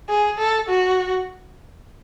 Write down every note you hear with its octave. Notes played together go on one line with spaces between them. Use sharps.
G#4
A4
F#4